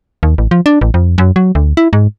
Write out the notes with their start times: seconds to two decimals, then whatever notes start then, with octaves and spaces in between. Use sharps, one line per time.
0.23 D#2
0.38 A1
0.51 F3
0.66 D4
0.81 A1
0.94 F2
1.18 F#2
1.36 F#3
1.55 D2
1.77 E4
1.93 G#2